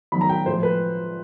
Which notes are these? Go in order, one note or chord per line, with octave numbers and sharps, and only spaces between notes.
D#3 F#3 B3 B5
A#5
G5
A2 F3 G#3 C5
B4